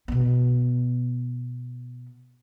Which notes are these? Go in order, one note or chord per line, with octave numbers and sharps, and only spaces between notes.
B2 B3